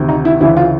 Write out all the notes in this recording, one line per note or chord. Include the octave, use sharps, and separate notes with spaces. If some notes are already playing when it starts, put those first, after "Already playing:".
Already playing: D2 C3 D#3
D#4
E4
D2 C#3 E3 E4
F4